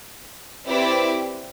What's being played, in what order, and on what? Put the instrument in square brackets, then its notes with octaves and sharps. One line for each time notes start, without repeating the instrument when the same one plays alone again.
[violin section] C4 E4 G4 B4 D5